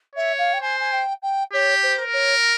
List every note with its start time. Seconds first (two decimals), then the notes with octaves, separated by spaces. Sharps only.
0.15 C#5 E5
0.38 F5
0.53 G5
0.61 C5 G#5
0.80 G#5
0.92 G5
1.22 G5
1.53 G4 C#5
1.83 C5
1.98 A#4
2.13 C#5